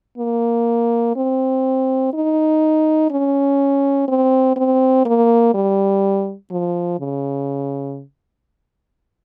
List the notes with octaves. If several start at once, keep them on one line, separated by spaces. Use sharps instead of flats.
A#3
C4
D#4
C#4
C4
C4
A#3
G3
F3
C#3